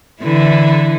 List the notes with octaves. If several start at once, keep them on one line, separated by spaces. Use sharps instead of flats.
D3 E3 E4